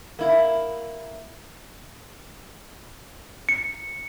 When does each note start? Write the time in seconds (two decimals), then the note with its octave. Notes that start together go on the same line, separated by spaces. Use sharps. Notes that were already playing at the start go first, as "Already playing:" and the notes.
0.19 A#3 E4
3.49 C#7